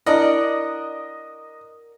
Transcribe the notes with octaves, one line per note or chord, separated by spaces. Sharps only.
D4 E4 A#4 D5 D#5 F#5